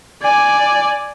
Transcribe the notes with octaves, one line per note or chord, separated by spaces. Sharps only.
D5 G#5